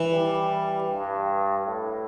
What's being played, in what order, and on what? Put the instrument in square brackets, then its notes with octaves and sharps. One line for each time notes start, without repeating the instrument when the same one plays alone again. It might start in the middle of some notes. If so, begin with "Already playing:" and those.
Already playing: [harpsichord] E3
[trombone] G3
G2
A2